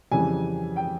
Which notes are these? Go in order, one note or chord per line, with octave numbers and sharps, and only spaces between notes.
F2 C#3 E3 G3 G#5
G5